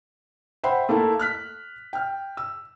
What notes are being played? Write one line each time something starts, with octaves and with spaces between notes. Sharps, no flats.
C5 E5 F#5 G5 B5 C6
A3 A#3 E4 A4
F6 F#6 B6
G5 F6
E6